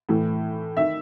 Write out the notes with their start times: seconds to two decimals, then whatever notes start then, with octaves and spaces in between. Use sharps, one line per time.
0.09 A2 E3
0.77 D#3 E5